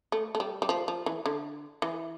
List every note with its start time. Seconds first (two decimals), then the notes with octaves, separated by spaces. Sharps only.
0.12 A3
0.35 A3
0.40 G3
0.62 G3
0.69 F3
0.88 F3
1.06 E3
1.26 D3
1.82 E3